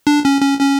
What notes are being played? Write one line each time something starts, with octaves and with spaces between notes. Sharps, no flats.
D4
C#4
C#4
C#4